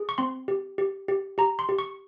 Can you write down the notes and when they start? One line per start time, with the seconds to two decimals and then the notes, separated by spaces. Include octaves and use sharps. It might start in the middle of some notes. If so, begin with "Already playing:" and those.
Already playing: G#4
0.09 C#6
0.18 C4 C6
0.48 G4
0.78 G4
1.08 G4
1.38 G4 A#5
1.59 C6
1.69 G4
1.79 C#6